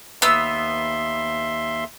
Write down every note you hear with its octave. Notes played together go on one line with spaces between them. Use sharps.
D#2 B3 E5 C6 E6